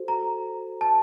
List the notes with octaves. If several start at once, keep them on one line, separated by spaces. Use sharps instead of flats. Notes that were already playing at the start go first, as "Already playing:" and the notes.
Already playing: F#4 A4 C5
A#5
A5